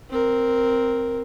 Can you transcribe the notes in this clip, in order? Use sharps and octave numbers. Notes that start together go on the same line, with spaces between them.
C4 A#4